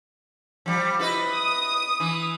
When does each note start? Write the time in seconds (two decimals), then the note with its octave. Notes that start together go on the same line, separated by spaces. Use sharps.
0.66 F3 G3
0.99 E4 B4 D#5
1.32 D#6
2.00 E3